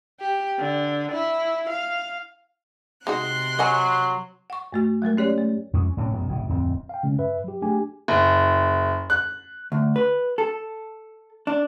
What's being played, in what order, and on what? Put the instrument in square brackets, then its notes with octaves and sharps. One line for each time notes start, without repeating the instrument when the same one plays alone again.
[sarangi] G4
D3
E4
F5
[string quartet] C3 C6 F#6 [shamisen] G#3 D#4 F#4
[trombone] F#3 [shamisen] D#5 F#5 G#5
[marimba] F#5 C#6
G2 A3 F#4
F#3 G#3 A3 A#4
C#4 G4 C#5 D5
A3
[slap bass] F2 G#3 C#4
A2 C3 C4 C#4
E1 F#2 F#3 B3
F#1 A2 C3
D1 F2 C4
[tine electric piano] F5 G5
C#3 G#3 C#4
G2 B4 E5
F#3 G4
A3 D4 G4 G#4 G#5
[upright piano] F#1
F#6
[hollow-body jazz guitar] D2
B4
A4
D4